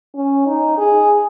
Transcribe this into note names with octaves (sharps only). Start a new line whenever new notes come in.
C#4
D#4
G#4